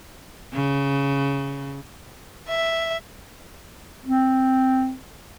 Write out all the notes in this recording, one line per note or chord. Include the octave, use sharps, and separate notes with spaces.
C#3
E5
C4